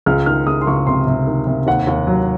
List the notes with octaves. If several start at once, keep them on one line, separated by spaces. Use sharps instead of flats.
C#2 F6
D#3 F6
C#2 D#6
C6
C#2 C#6
C3 C6
C3
D#3
C3
D#2 F#5
D#2
F#3